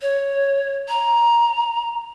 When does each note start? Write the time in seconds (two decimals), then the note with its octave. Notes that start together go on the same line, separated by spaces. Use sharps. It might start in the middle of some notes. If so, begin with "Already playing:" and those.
0.02 C#5
0.89 A#5